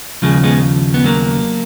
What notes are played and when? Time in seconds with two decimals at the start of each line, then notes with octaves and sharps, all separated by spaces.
0.22 D#2 C#3 F3 G#3
0.44 G#3 B3
0.94 B3
1.04 F#3 A#3